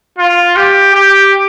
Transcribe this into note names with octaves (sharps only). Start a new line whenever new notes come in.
F4
G4
G4